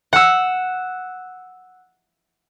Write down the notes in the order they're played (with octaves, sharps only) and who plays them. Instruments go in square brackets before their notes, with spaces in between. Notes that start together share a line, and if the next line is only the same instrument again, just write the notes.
[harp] F#5 E6